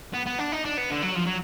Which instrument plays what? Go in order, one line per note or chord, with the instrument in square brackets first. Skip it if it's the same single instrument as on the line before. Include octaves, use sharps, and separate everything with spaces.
[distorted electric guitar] B3
B3
D4
D#4
D4
B3
D3
F#3
F3
F#3